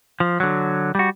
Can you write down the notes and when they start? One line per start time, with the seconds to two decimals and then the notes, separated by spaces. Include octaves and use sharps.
0.20 F3
0.40 D3 F#3
0.95 G3 F#4